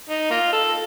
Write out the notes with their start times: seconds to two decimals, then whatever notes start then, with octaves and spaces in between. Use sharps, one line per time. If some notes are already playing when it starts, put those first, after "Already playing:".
0.09 D#4
0.30 A#3 F4
0.52 A4